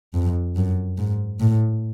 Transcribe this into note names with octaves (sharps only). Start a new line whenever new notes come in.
F2
F#2
G#2
A2